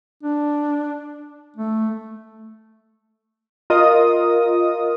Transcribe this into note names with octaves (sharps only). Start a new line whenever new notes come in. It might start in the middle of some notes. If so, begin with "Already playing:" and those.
D4
A3
F4 A#4 D#5 D#6